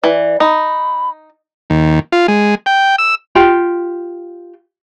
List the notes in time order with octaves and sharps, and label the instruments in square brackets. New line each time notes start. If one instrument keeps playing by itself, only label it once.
[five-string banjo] E3 [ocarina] D5
[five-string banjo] D#4 [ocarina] B5
[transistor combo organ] D#2
F4
G#3
G5
E6
[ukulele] F4 G4 G5